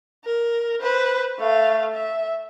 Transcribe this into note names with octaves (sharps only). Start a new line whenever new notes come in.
A#4
B4 C5
A3 F5
E5